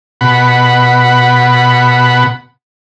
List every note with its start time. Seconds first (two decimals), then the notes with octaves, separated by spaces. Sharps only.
0.21 B2 F#5 B5